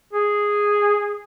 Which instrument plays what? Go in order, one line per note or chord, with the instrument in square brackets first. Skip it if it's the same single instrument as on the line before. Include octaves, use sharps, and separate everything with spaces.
[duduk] G#4